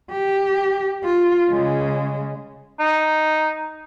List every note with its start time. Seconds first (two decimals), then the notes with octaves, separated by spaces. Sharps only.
0.11 G4
1.04 F4
1.50 C#3 G#3
2.80 D#4